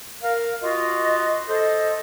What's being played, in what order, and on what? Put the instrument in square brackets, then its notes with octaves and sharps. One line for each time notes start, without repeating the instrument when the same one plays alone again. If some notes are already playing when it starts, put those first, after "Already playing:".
[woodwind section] A#4 F5
F4 F#4 D#5
A4 C5 D#5